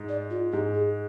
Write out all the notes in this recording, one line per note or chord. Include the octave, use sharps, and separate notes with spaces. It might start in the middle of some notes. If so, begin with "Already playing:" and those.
Already playing: G#2
D5
F4
G#2 G4
G#4